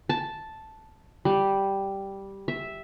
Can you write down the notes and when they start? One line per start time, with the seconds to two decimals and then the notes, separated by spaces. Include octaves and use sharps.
0.09 A5
1.25 G3
2.48 E5